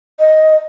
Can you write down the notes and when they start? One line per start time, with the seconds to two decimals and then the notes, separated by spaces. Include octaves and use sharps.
0.19 D#5